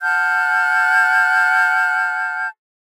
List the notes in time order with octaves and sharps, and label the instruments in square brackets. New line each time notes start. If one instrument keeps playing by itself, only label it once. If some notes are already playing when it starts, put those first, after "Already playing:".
[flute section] F#5 A5 F6 G6